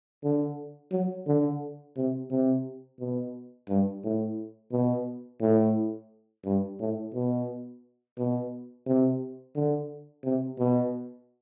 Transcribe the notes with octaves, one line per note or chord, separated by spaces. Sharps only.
D3
F#3
D3
C3
C3
B2
G2
A2
B2
A2
G2
A2
B2
B2
C3
D3
C3
B2